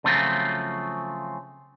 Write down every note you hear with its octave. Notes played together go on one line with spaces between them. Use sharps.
C#3 F3 F#3 A3 C4 F4